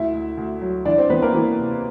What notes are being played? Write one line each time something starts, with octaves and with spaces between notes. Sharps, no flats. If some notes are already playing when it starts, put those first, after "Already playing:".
Already playing: D2 E4 E5
D2
D2
F#3
E3 D4 D5
C4 C5
E3 B3 B4
A#3 A#4
E3
C3